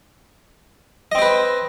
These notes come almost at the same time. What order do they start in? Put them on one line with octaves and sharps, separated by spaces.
D#5 C4 C5 B4